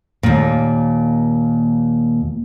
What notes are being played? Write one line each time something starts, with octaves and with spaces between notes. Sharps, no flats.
D#2 A#2